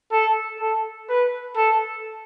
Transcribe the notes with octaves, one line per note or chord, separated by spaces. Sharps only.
A4
A4
B4
A4